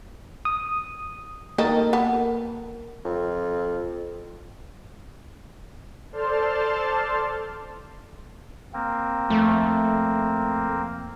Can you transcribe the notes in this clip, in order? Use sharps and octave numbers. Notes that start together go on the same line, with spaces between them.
D#6
D#3 A#3 A4 A#4 D#5
B3 A4
F2
A4 C5 D5 A5 C6 F6
A#3 C4
F2 A3